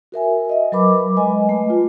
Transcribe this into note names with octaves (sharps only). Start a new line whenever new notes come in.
F#4 A#4 E5 G#5
D#5 E5
F#3 A#4 B4 B5 D6
G#3 B4 D#5 G#5
A3
F4